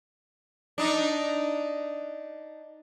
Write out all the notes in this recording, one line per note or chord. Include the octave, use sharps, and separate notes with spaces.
D4 D#4